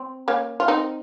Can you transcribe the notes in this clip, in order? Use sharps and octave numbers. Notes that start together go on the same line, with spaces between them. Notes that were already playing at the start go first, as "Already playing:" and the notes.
Already playing: C4
A#3 C#4
F4
C4 D#4